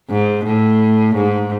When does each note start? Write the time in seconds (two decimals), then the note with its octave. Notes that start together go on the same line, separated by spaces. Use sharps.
0.10 G#2
0.45 A2
1.16 G#2